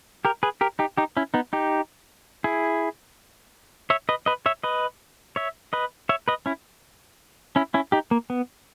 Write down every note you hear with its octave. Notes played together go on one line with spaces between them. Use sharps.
G4 A#4
G#4 B4
G4 A#4
D#4 G4
D#4 G4
C#4 E4
B3 D#4
D#4 G4
E4 G#4
C#5 E5
B4 D#5
B4 D#5
C#5 E5
B4 D#5
C#5 E5
B4 D#5
C#5 E5
B4 D#5
C#4 E4
C#4 E4
C#4 E4
D#4 G4
A#3
B3